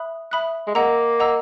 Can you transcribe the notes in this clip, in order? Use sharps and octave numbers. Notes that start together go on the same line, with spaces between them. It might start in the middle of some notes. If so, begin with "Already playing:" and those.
Already playing: E5 B5 D#6 F#6
E5 B5 D#6 F#6
G#3
A#3 D#5 F#5 A#5 E6
D#5 F#5 A#5 E6